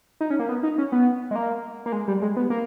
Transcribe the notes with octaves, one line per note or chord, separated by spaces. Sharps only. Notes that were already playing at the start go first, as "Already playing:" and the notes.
D#4
C#4
A#3
B3
D#4
C#4
B3
G#3
A#3
A#3
G#3
G3
G#3
B3
A#3